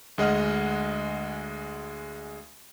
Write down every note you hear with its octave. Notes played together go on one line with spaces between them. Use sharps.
D2 G#3 D#5 F#5 F6